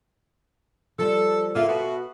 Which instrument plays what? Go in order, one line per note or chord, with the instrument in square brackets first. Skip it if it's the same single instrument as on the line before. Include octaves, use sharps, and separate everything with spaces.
[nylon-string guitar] F3 G3 [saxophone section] A4
[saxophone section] A#3 F4 [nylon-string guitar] A4 E5
[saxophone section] B2 B3 F#4